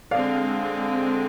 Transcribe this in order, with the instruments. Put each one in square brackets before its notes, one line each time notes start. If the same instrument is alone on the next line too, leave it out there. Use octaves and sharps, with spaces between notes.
[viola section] D3 G#3 C4 [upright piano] D5 F5